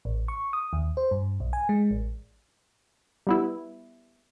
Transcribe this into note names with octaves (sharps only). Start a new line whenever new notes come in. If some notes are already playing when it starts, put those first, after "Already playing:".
A1
C#6
D#6
D#2
C5
G2
B1
G#5
G#3
A1
G3 B3 E4